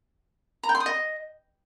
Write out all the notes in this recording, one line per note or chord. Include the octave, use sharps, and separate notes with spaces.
A#5
G5
C6
D#6
D#5